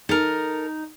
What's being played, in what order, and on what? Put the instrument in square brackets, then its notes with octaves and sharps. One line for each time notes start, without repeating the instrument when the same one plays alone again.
[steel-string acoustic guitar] D#4 [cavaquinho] A4 A#4